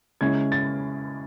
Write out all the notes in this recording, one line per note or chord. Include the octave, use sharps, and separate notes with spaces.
C#3 G#3 C#4 E4 G#6
A6